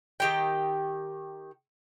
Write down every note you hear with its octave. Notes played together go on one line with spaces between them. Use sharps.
D#3 G4 G5